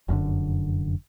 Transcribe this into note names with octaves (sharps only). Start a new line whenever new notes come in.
F1 F#2 A2 D3